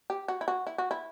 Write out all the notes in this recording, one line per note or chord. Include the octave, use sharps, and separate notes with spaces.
G4
F#4
E4
F#4
E4
F#4
E4